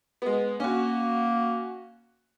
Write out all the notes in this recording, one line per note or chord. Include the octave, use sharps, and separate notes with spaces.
G#3 B3
A#3 C#4 F#4